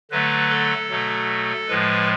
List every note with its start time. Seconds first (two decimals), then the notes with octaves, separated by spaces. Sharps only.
0.11 D3 F#3 A3 B4
0.50 A4
0.90 B2 F#3 A3
1.68 A2 F3 G#3 B4